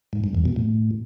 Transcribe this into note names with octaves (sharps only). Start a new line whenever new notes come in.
G#2
G2
E2
B2
A2